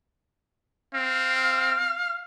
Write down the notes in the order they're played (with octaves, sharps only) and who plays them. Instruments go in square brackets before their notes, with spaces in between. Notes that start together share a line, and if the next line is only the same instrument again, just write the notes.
[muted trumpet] C4 [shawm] F5